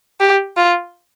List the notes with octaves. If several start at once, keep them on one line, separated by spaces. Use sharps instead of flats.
G4
F4